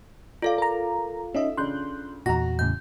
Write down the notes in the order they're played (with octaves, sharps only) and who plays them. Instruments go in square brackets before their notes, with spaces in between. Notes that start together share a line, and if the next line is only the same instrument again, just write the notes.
[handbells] F4 A4 F5 [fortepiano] D5
[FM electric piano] A#4 A#5
[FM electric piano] C#4 D#4 D#5 [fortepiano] E5
[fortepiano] C#3 D4 [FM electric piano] C6 F#6 G6
[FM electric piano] E2 A#2 [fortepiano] F#4 A#5 [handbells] A#6
[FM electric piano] E2 A2 C#3 [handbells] G6